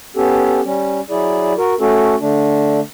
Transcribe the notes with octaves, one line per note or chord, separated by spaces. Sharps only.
B3 C#4 G4 A4
G3 C#4
F#3 E4 G#4 D5
F#4 A#4
A3 C#4 F#4 A4
D3 A3 D4